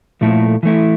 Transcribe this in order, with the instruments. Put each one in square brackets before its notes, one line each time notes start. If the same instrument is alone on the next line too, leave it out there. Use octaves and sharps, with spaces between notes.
[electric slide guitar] A#2 F3 A3 E4 A4
E3 A3 E4